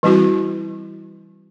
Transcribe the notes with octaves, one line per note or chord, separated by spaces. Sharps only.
E3 G3 C4 E4 F#4